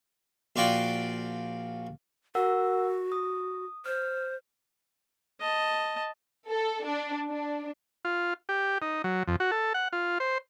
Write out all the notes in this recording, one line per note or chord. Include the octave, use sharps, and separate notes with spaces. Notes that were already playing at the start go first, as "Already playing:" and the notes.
A#1 F4 F#4 D5 G5
F#4 A#4 F#5 E6
D#6
C5 F6
D#5 A5
A4
D4
D4
F4
G4
D#4
F#3
F2
F#4
A4
F#5
F4
C5